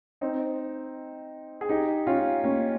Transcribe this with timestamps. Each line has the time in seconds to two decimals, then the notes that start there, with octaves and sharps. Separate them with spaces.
0.21 C4 D#4
1.61 G#4
1.69 D#4 G4
2.07 C#4 F4
2.44 A#3 C#4